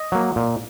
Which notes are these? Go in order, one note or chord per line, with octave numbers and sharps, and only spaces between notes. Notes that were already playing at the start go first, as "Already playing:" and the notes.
Already playing: D#5
F#3 A#3
A#2